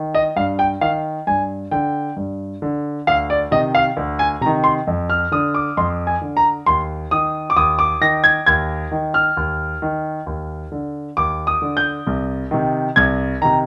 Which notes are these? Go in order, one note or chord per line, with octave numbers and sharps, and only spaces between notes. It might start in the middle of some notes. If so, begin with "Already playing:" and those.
Already playing: D#3
D#5
G2 F5
G5
D#3 F5
G2 G#5
D3 G5
G2
D3
D2 F5
D5
C3 D#3 D#5
F5
D2
G#5
C3 D#3 A#5
C6
F2
F6
D3 D#6
D6
F2 C6
G#5
D3
A#5
D#2 C6
D#3 D#6
D6
D#2 D#6
D6
D#3 A#6
G#6
D#2 G#6
D#3
F6
D#2
D#3
D#2
D3
D#2 D6
D#6
D3
G6
C2
C3 D#3
C2 G#6
C3 D#3 A#5